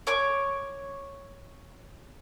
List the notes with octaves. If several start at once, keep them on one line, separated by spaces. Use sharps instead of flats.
C#5 C#6 D6